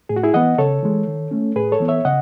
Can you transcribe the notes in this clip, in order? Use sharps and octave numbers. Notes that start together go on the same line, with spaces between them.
A2 G#4
F#4
E4 G#4
E3 B3 D#5 F#5
C#3 A4 C#5
E3 G#3
D#3
A3 C#4
A2 G#4 B4
A4 C#5
E3 B3
C#5 E5
C#3 D#5 F#5